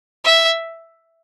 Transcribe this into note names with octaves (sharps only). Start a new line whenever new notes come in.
E5